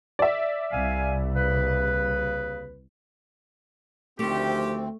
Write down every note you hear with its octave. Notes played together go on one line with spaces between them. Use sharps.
D5 E5
C2 F5 G#5
D#2 C#3 B4
D2 D#3 F3 A3 C4 G4